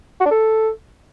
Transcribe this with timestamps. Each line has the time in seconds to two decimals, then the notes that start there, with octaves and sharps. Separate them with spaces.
0.20 F#4
0.25 D4
0.31 A4